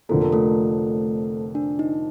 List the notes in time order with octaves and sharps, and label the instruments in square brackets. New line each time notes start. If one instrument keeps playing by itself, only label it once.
[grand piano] F1 F2 D3 F3 A#3 [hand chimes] A4
[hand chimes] A#4
A3 A4
D4
D#4